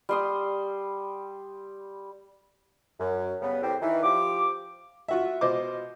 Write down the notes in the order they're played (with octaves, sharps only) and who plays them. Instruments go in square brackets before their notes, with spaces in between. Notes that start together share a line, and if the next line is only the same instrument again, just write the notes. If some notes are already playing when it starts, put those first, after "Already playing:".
[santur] G3 C6 D#6
[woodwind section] F#2
C#3 G3 B3
E2 A2 G3 C4
D#3 E3
F3 G4 D6
[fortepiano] F4 F#4 E5
B2 F4 C5 D#5 D6